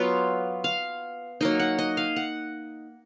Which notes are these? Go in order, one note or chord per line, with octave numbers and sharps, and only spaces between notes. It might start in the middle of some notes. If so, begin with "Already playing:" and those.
Already playing: F#3 B3 F4
F5
F#3 A#3 D#4 D#5
F#5
D#5
F5
F#5